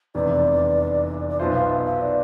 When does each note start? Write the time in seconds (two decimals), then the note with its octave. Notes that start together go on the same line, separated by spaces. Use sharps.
0.15 F1 E2 C3 E3 B3 D5
1.29 D5
1.39 B1 B2 B3 F4 C5 E5
1.54 F5
1.69 E5
1.85 E5
2.00 D5